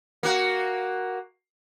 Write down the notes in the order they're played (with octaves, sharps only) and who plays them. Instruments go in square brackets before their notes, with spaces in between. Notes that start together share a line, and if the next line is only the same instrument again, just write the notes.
[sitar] A#3 F#4